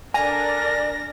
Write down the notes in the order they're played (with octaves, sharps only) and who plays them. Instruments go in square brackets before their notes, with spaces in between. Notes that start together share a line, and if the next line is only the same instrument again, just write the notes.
[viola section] D4 A#4 [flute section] A4 D5 F6 [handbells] G#5 [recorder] A#6